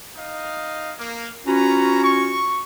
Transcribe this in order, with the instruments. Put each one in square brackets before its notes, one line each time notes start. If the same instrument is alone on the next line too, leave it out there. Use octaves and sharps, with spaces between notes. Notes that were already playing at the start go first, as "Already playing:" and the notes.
[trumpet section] D#4 D#5 F5
A#3
[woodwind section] C#4 F4 F#4 [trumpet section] B4 A#5
[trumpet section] C#6